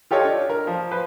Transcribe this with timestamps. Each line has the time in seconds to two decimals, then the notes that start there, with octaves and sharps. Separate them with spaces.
0.11 F4 G4 A4 C#5 D#5
0.24 D4
0.50 A#4
0.67 F3
0.91 B4 C5